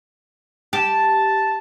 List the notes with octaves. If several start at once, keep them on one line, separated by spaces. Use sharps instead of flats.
G4 A5